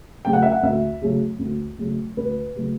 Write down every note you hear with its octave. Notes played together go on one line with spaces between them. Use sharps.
C#3 F#3 A3 G5
F#5
E5
F#5
D2 E5
C#3 F#3 A3
D2
C#3 F#3 A3
D2 B4
C#3 F#3 A3